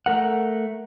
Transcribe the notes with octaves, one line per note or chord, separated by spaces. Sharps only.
A3 A#4 F#5